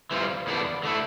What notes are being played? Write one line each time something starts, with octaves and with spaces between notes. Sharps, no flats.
E3 G3 C4 F4
E2 D3 G3 B3 D4
D3 A3 E4